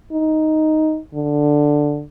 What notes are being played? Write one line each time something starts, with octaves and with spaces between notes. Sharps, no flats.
D#4
D3